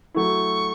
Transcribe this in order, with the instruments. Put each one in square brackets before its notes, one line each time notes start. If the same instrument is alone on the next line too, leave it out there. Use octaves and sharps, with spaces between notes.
[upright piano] F#3 A3 E4 [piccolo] C#6